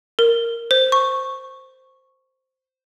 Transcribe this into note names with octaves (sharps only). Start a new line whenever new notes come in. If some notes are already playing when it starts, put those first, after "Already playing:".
A#4
C5
C#6